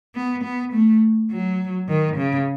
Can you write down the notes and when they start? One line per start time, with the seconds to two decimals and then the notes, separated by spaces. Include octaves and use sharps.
0.15 B3
0.44 B3
0.73 A3
1.31 F#3
1.89 D#3
2.17 C#3